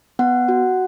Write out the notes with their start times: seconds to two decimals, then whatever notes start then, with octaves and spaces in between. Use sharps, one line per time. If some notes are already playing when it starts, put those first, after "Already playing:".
0.19 B3 F#5
0.48 F#4